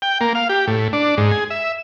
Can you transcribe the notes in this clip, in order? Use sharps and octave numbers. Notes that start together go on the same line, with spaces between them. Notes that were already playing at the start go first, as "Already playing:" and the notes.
G5
A#3
F5
G4
A2
D4
G#2
G#4
E5